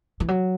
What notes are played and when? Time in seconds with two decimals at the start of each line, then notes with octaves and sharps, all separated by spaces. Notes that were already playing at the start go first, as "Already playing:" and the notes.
0.20 E3
0.28 F#3